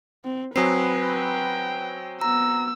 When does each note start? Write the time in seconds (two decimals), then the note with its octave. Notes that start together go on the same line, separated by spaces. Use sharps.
0.25 C4
0.56 F#3 C4 B4 G#5 D#6 C7
1.01 G5
2.21 B3 A#5 E6